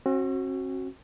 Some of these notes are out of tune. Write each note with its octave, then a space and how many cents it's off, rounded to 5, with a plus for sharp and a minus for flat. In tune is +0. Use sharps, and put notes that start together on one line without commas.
C4 +45 F#4 +0